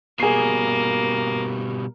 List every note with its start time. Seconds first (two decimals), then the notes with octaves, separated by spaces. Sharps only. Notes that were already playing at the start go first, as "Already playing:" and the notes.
0.20 B2 G3 A#3 G#4 C7